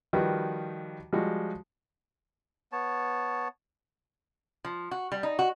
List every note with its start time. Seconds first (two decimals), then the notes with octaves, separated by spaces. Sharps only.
0.13 D#3 F3 G3 F#4 B4
1.13 F3 G3 G#3 F#4
2.72 B3 C#5 A5
4.64 F3
4.91 F#4
5.12 G3
5.23 D#4
5.39 F#4